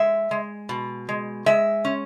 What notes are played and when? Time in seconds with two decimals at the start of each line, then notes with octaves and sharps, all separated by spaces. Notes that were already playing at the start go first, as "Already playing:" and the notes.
Already playing: G#3 E5
0.31 G#3
0.69 B2
1.09 G#3
1.46 G#3 E5
1.85 C#4